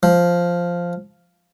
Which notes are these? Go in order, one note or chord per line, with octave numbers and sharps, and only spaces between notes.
F3